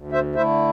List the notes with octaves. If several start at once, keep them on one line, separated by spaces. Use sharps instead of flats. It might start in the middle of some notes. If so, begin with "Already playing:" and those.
Already playing: D2
C5 E5
D3 A3 E4 C5 E5